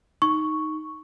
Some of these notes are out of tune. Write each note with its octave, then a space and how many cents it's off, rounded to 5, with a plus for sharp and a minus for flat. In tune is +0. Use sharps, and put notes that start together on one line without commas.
D#4 +0 C#6 +0